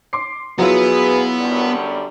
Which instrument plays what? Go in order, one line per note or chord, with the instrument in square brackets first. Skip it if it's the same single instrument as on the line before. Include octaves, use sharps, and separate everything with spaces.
[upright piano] C6 D6 C7
[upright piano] F#3 E4 F4 [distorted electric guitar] B3 [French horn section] G#4 B4
[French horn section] F#2 D3 G3